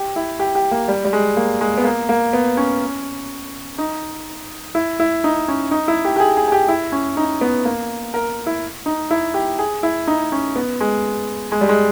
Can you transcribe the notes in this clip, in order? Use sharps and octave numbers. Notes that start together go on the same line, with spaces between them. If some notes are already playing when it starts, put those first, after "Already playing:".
Already playing: G4
E4
G4
G4
A#3
G3
G3
G#3
A#3
G#3
B3
A#3
A#3
B3
C#4
D#4
E4
E4
D#4
C#4
D#4
E4
G4
G4
G#4
G#4
G#4
G4
E4
C#4
D#4
B3
A#3
A#4
E4
D#4
E4
G4
G#4
E4
D#4
C#4
B3
G#3
G#3
G3
G#3